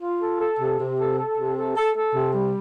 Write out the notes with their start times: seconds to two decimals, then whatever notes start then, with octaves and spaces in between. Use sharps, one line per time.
0.02 F4
0.21 A4
0.40 A4
0.60 C3
0.79 C3
0.98 A4
1.18 A4
1.37 C3
1.57 A4
1.76 A4
1.95 A4
2.15 C3
2.34 G3